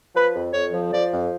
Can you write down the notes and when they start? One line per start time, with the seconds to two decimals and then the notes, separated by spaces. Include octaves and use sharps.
0.14 F3 B4
0.33 F2
0.52 F2 C#5
0.72 F3
0.92 F3 D5
1.12 F2